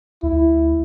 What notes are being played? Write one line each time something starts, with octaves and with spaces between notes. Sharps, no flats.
D2 E4